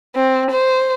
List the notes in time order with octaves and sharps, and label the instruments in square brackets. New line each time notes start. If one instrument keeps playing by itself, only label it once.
[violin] C4
C5